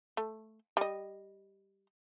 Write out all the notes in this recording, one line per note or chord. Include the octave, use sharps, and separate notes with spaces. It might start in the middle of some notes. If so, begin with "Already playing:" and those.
A3
G3 D#5